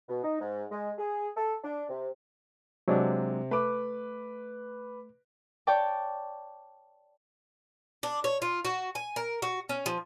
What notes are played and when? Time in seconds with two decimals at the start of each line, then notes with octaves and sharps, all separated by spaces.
0.09 B2
0.24 D#4
0.41 G#2
0.71 G#3
0.98 G#4
1.37 A4
1.64 D4
1.89 C3
2.88 C3 F#3 G#3 D4
3.51 A3 B4 D6
5.67 C#5 D5 G5 A5 D6
8.03 D4
8.24 C#5
8.42 F4
8.65 F#4
8.95 G#5
9.16 A#4
9.42 F#4
9.69 C#4
9.86 F3